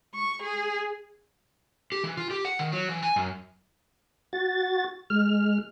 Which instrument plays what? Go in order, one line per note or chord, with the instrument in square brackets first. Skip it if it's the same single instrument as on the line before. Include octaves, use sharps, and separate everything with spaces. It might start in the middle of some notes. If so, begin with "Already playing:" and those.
[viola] C#6
G#4
[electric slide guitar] G4
E3
F4
G4
F#5
D#3
F#3
E3
G#5
F#2
[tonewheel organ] F#4 A6
G#3 F6